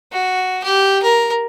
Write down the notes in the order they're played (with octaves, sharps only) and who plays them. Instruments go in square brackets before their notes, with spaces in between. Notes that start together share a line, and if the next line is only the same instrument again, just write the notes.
[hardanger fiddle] F#4
G4
A#4